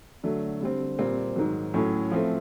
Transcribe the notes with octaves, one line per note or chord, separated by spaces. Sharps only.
D3 F#3 A3
D3 G3 C4
A#2 G3 C4
G#2 D#3 F#3
A2 F#3 A3 C#4
F3 A3 C4 E4